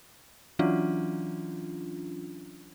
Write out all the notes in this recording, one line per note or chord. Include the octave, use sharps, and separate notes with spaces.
E3 F#3 C#4 D4 F4